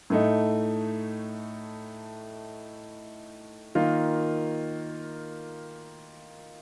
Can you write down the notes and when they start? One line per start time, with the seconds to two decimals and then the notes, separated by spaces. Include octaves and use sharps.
0.10 A2 A3 D#4
3.75 D#3 A#3 F4